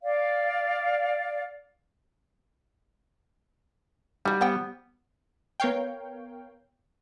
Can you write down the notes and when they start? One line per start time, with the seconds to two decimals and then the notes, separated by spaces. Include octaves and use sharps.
0.03 D5 F5
4.25 G3 D#4 F#4
4.41 B3 C5 F#5 G5
5.60 B3 A#4 C#5 F5 G5